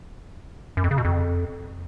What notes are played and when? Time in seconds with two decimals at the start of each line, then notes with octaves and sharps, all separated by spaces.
0.77 F#2
0.84 F2
0.91 C#3
0.98 B2
1.05 F2